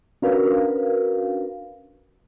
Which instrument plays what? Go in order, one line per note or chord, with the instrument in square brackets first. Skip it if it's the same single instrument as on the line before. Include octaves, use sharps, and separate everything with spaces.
[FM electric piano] C#4 D4 F#4 A#4 B4 F5